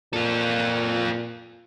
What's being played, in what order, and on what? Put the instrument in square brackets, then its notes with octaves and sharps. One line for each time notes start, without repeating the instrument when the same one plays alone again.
[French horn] A#2 [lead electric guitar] F4 A4